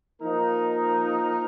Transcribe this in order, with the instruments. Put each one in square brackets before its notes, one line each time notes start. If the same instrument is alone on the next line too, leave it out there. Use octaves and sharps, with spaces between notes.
[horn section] F3 A#3 D#4 [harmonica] A#4